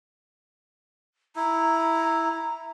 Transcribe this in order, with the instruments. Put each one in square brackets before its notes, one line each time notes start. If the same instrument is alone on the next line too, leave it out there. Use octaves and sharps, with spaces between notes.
[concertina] E4 [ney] A#5